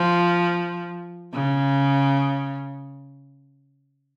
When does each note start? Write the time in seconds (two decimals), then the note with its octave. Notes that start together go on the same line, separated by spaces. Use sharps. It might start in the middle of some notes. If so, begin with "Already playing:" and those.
Already playing: F3
1.33 C#3